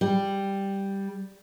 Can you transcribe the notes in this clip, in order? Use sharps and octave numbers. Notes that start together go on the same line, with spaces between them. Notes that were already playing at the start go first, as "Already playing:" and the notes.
G3